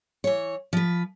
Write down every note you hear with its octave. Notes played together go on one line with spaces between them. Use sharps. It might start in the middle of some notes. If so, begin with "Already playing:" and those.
E3 C#5
F3 B4